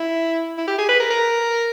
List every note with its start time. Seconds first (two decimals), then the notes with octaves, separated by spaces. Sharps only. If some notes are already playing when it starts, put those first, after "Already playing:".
Already playing: E4
0.58 E4
0.67 G4
0.78 G#4
0.89 B4
1.00 A#4
1.10 A#4